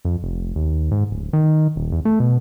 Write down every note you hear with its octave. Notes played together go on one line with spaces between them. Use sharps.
F2
F1
D#2
G#2
D1
D#3
D#1
E2
A3
B2